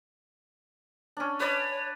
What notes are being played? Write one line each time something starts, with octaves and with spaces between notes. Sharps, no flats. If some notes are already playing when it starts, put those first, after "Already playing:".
C#4 D4
B4 C#5 D5